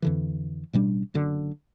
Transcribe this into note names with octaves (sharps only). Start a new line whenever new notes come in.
F2 D3 E3
A1 B2 G3 D4
F#1 F#2 D3